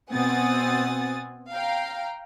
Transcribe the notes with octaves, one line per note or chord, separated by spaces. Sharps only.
B2 C4 F#5 G#5 D#6 A6
F5 G5 A#5